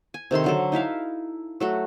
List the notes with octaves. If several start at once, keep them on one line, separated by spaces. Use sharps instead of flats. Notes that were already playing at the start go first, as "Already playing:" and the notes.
G#5
C3 D#3 A4 C6
D3 F#3 A4
D#4 E4 E5 F5
F#3 A3 F#4